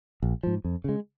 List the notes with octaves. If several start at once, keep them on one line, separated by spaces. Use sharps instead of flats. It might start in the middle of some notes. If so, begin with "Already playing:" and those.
A#1
G#2 F3
F2
C#3 G#3